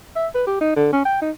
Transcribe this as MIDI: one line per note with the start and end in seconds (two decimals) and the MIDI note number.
0.16 0.27 76
0.35 0.45 71
0.47 0.57 67
0.61 0.76 63
0.76 0.92 50
0.93 1.03 61
1.05 1.19 79
1.22 1.31 63